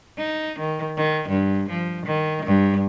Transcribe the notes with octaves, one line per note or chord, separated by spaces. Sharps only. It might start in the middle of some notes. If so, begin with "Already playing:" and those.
D#4
D#3
D#3
G2
F3
D#3
G2